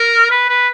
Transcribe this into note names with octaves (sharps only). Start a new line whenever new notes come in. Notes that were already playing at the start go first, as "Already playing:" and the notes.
Already playing: A#4
B4
B4